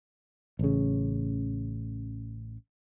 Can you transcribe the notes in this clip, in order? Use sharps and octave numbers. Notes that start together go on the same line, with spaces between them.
A1 C#3